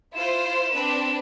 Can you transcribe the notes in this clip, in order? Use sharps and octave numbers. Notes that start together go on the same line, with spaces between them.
E4 F4 C5 E7
C4 D4 B4